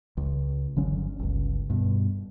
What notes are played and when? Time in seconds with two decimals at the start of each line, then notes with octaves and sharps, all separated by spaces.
0.17 C#2
0.76 G1 D3 F#3 C#4
1.19 G1 C#2
1.70 G2 B2